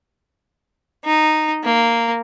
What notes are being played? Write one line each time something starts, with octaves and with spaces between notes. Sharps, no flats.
D#4
A#3